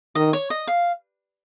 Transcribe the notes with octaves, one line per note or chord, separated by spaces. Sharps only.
D#3 D#5
C#5
D#5
F5